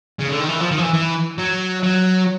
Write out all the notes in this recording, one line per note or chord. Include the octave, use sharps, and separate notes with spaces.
C#3
D3
D#3
E3
F3
D#3
F3
E3
E3
F#3
F#3